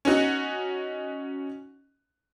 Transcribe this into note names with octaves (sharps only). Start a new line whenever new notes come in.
C#4 D#4 F#4 F#5